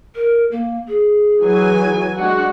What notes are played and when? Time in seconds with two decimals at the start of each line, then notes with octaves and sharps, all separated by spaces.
0.15 A#4
0.51 A#3
0.88 G#4
1.41 E3 F#3 G#5
2.18 G#3 D4 F#4